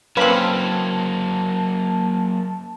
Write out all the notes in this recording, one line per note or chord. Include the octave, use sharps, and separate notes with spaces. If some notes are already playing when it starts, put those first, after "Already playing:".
F#3 A#3 C4 C#4 B4 F5 A5 B5